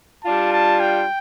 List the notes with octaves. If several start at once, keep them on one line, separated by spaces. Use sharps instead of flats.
G3 D4 F4 A5
A5
G5